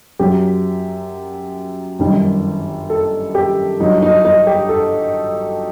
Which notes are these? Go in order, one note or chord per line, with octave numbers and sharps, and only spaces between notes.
F#2 F#3 G4
G1 F#2 D#3 G3
A4
G4
G1 G2 F#3 D#4
D#4
D#4
G4
A4